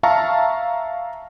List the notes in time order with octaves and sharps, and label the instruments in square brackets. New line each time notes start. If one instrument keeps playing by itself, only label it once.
[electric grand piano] E5 F5 A5 A#5 C#6